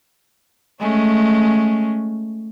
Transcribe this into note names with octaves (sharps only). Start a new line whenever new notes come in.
G#3 A3 C#4